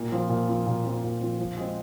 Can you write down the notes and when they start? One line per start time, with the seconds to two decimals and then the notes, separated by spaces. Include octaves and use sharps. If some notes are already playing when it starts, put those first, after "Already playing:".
Already playing: A#2
0.12 F3 C4 F4
0.29 A#2
0.48 F3 C4 F4
0.66 A#2
0.84 F3 C4 F4
1.03 A#2
1.21 F3 C4 F4
1.39 F3
1.57 G#3 C4